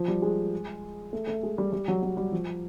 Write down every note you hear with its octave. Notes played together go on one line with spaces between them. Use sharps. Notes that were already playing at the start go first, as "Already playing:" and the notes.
Already playing: F3
G3
G#3
A3
A3
G#3
G3
G3
F#3
F#3
G3
F3